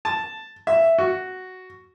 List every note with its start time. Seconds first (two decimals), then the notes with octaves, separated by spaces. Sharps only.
0.05 A5
0.67 E5
0.98 F#4